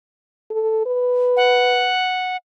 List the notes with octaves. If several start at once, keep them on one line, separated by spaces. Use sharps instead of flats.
A4
B4
F#5